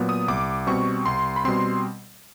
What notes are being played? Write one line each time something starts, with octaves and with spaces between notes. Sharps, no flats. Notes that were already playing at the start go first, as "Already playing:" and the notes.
Already playing: A#2 F#3 B3
D#6
C2 D6
B2 G3 C4 C#6
C2 C6
B5
B2 G3 C4 C6